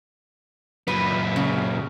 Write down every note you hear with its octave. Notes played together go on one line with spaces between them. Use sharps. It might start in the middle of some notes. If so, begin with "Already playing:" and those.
F#2 A#2 B4
C#3